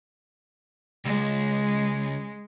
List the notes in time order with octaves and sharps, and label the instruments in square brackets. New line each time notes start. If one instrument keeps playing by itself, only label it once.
[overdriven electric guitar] C#2 [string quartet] G#3